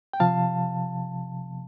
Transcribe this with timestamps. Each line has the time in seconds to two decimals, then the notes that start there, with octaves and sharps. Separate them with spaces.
0.13 G5
0.20 C3 F3 F5 A5